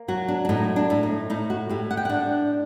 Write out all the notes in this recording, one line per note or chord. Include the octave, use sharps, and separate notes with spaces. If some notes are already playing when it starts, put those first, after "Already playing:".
Already playing: A#3
F#3 F#4
D4
D4
A2 D#4
D4
A2
D#4
A2 D#4
F#4
A2 G4
F#5
G5
D4 F#5